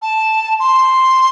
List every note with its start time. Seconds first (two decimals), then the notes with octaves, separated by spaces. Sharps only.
0.02 A5
0.60 C6